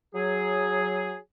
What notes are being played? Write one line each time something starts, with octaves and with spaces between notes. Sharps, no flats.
F#3 G#4